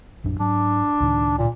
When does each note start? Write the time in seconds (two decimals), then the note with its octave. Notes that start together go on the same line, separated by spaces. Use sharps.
0.24 A#1 F#2 D4
0.40 G#2 F#3 D4
1.00 C#2 A2 D#3
1.38 A#2